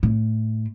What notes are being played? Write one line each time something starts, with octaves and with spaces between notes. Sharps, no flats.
A2